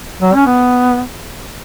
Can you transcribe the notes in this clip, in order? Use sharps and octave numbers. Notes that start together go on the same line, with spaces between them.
F#3
C#4
B3